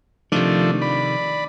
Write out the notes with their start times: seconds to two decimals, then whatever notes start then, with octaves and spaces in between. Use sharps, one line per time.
0.32 C3 D#3 F3 A3 D4
0.82 D5 B5